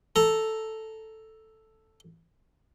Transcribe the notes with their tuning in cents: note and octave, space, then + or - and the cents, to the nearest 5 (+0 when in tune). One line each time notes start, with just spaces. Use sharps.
A4 +0 A#5 +0